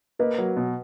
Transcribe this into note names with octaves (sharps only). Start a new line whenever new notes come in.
A#3 B4 D#5
F#3
B2